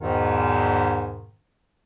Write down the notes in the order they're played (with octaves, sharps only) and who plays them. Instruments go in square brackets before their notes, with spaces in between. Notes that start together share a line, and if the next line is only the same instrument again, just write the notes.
[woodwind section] E2 G#2 B2 D#3